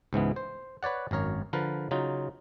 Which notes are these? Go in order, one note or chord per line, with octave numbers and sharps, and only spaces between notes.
C#2 G#2 E3 B3
C5
B4 C#5 D5 F#5
G#1 F#2 A#4 C#5
D3 F3 A#4 B4
C#3 F#3 D#4 F4